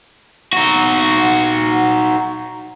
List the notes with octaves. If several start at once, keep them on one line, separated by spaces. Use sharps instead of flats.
D#4 F#4